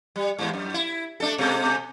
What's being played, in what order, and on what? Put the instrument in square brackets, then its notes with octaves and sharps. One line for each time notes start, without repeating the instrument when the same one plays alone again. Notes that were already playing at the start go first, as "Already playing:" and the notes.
[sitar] G3
E2 G#2
F#2
E4
A3 D4 A4
B2 G#3 A4